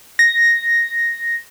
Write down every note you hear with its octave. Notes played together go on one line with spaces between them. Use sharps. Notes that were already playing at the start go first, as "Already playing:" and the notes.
A#6